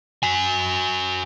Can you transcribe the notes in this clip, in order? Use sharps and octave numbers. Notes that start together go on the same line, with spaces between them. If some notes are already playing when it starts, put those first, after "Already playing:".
F#4 G#5